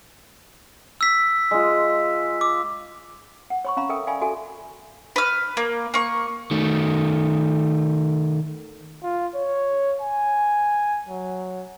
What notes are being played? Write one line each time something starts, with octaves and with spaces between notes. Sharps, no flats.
E6 B6
G#3 F4
D6
F#5
C#5 B5 C#6
C#4 F5 A#5 B5
A4 A#4 E5 G5 D#6
D5 F5 G5 G#5 B5
F#4 A4 E5 G#5
B4 F6
A#3
A#3 C#6
D#3 A3
F4
C#5
G#5
F#3